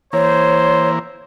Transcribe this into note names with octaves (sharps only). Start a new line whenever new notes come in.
E3 A#3 C5 C#5